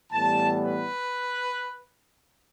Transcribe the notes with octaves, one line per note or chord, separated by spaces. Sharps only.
A2 E3 G3 B3 A5
B4